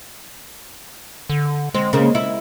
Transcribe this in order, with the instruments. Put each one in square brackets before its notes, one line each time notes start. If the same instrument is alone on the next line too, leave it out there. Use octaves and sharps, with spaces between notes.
[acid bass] D3
[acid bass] G#3 [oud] C4
[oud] C#3 A#3
E4